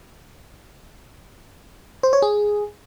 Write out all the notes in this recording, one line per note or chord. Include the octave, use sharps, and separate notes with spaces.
C5
C#5
G#4